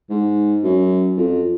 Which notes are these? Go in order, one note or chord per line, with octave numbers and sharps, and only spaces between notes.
G#2
F#2
F2